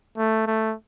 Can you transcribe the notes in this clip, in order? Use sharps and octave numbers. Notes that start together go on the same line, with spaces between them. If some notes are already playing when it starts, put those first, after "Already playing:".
A3
A3